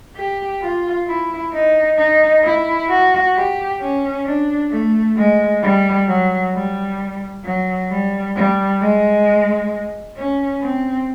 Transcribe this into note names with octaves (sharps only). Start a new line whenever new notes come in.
G4
F4
E4
D#4
D#4
E4
F#4
G4
C#4
D4
A3
G#3
G3
F#3
G3
F#3
G3
G3
G#3
C#4
C4